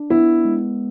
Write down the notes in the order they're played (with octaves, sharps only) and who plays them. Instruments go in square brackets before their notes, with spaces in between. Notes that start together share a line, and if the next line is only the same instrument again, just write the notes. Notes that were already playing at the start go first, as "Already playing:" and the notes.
Already playing: [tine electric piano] D4
[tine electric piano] B3 [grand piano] E4
[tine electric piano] G#3